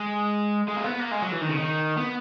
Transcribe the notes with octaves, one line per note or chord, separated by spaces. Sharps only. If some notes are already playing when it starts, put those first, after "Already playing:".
Already playing: G#3
G#3
A#3
B3
A#3
G#3
F#3
E3
D#3
C#3
D#3
B3